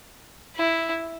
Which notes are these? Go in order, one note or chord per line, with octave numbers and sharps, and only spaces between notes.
E4